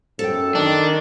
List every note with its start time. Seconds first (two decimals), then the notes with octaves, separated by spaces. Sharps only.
0.19 F#2 A4 G5
0.55 D#3 D4